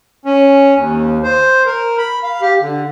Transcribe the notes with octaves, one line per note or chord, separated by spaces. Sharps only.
C#4
D#2
C5
A#4
B5
F5
G4
D3